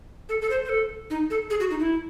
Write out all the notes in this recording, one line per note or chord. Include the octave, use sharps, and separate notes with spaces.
A4
A4
C5
C5
A4
D#4
A4
G#4
F#4
D#4
E4